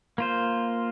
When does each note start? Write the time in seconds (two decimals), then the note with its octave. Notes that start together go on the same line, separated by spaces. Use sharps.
0.18 A#3 F4 C5